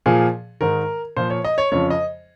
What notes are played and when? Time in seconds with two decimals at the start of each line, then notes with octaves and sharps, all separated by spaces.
0.06 A#2 F3 G#4
0.61 G#2 D#3 A#4
1.16 A#2 F3 C5
1.30 C#5
1.44 D#5
1.58 C#5
1.72 F2 C#3 F3 C#5
1.90 D#5